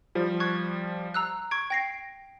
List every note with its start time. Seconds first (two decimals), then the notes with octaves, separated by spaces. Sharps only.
0.15 F3 G3
0.40 C#6 F#6 G#6
1.14 A#5 E6 F#6
1.51 C#6 G#6 D7
1.70 G5 A#6 C7